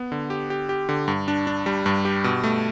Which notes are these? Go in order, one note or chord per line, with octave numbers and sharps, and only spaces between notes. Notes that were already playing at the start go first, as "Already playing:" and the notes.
Already playing: B3
D3
G4
G4
G4
D3
G2
D4
D4
G3
G2
G4
B2
A3